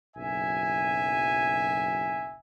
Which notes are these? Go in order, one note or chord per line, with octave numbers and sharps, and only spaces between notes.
F#1 B1 E5 G#5